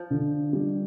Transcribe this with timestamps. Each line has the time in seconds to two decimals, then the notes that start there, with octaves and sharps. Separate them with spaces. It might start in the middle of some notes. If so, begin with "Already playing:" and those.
Already playing: F3
0.10 D3
0.53 G3